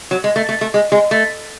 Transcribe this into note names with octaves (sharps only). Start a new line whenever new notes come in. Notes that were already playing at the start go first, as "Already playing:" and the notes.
F#3
G#3
A3
A3
A3
G#3
G#3
A3